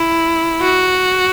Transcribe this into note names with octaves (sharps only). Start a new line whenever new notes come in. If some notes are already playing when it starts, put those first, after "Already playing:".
Already playing: E4
F#4